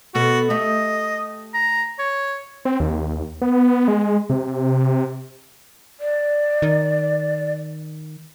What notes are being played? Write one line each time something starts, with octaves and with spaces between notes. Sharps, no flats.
B2 B3 F#4 A4
A3 G4 D#5 E5
A#5
C#5
C4
D#2
B3
G#3
C3
D5
D#3